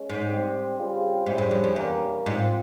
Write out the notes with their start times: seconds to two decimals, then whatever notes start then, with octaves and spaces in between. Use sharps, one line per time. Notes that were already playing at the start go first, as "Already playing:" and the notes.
Already playing: G#3 C#4
0.10 G#2
0.26 G3 C4 G4 C5
0.76 C#3 G3 C4 F4 G#4
1.26 G#2 G3 C#4 E4 G#4 C5
1.38 G2
1.51 F2
1.64 F2
1.76 E2 A#2 G3 A#3 C#4
2.26 G#2 F3 C4 F4